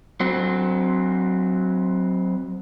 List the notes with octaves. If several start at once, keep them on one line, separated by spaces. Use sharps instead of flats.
F#3 C4